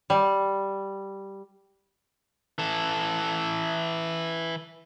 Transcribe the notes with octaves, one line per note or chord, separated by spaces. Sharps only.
G3
E3 A4